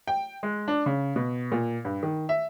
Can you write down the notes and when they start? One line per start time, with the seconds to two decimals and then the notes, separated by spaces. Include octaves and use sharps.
0.07 G5
0.43 G#3
0.68 D4
0.86 C#3
1.16 B2
1.52 A#2
1.85 G2
2.03 D#3
2.29 E5